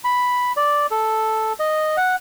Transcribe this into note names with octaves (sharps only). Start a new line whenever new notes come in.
B5
D5
A4
D#5
F#5